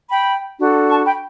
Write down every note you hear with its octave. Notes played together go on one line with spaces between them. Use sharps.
G5 B5
D4 F#4 A4
A5 C#6
G5 B5